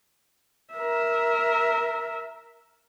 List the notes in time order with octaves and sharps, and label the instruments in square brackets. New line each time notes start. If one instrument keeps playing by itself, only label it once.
[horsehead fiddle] A#4 E5